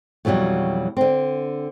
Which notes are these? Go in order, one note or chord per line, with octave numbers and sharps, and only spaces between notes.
F2 B2 E3 F#3 G3
D3 C4